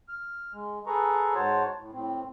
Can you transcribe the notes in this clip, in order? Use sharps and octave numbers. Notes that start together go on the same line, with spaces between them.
F6
G#3
G#4 A4 B4 A#5 C#6
G#2 F#4 C5 C#5 A5
A2
A2 C4